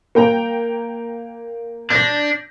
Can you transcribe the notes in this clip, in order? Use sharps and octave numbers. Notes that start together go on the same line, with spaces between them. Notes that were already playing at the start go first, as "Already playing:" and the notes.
A#3 G5 A#5
D4 G6 A#6